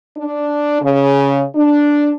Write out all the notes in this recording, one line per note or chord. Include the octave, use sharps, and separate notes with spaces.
D4
C#3
D4